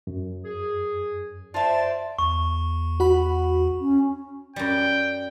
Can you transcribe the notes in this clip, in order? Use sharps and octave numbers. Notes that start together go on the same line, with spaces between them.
F#2
G#4
F4 C5 D5 E5 A5
E2 C#6
F#4 F#5 B5
C#4
F#2 G3 G5